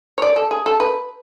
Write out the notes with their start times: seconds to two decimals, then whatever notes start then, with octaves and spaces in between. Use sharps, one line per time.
0.18 C#5
0.22 D5
0.36 A4
0.51 G#4
0.66 A4
0.80 B4